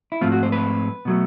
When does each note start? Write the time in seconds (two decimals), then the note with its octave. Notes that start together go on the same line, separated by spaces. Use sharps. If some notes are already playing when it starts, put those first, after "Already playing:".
0.12 E4
0.21 G#2 F3 A3 C4 F4
0.32 F#4
0.43 C5
0.52 B4
1.05 B2 F#3 A3